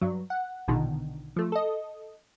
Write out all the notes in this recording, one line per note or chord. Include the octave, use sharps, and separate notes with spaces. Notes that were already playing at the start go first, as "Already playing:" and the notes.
G2 F#3
F#5
A#1 B2 D3 D#3
F3 A3
A4 D#5